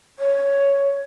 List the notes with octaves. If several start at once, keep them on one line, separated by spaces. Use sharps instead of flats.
C#5